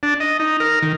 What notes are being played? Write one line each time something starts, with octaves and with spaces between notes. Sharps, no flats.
D4
D#5
D#4
A#4
D#3